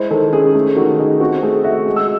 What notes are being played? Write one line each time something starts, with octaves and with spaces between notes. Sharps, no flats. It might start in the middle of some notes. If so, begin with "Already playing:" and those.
Already playing: G#3 E4 C5
D#3 A4
C#4 G#4
A3 G#4
D#3 F#4
D#4 G#4
C4 F#4
A3 G#4
F#4 E5
G#3
E6